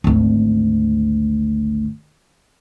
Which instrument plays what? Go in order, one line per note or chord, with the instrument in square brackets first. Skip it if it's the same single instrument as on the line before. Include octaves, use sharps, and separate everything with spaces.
[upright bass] G#1 D2